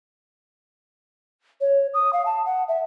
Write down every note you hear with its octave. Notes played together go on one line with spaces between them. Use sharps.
C#5
D#6
F5
A5
F#5
E5